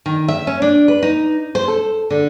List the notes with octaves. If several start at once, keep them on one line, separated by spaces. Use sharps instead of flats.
D#3
E5
C#4
D4
B4
D#4
C5
A4
D3